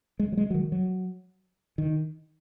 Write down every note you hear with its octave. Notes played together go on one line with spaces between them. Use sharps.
G#3
F#3
G#3
F#3
D#3
F#3
D#3